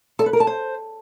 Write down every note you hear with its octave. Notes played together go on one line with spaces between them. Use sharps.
A4
B4
A#4
A5
C5